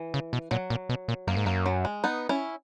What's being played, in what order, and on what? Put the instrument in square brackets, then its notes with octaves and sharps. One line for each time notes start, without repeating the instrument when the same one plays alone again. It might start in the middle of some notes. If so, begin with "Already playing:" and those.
Already playing: [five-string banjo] E3
[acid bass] C#3
B2
[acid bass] A#2 [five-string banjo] F#3
[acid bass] A#2
B2
A#2
[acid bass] F#2 [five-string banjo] A#3
[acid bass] G#2
[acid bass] F#2 [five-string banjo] A#3
[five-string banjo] F#3
G#3
B3 D#4
C#4 E4